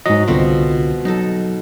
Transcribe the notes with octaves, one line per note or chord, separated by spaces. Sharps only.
G#2 F#3 D#5
C2 B2 D3 C4 F4
F#3 D#4 A4